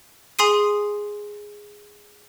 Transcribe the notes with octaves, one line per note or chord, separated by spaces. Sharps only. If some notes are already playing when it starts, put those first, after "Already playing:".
G#4 G#5 C6 D#6 C7 D#7